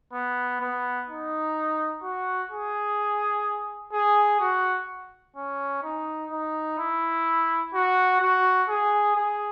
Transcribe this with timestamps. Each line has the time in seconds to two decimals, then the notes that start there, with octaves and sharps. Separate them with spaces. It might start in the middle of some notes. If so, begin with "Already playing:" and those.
0.13 B3
0.60 B3
1.08 D#4
2.02 F#4
2.51 G#4
3.93 G#4
4.40 F#4
5.36 C#4
5.83 D#4
6.31 D#4
6.78 E4
7.74 F#4
8.21 F#4
8.69 G#4
9.16 G#4